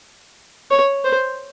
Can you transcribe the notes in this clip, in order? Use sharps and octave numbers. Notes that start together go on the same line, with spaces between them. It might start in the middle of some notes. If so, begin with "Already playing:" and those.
C#5
C5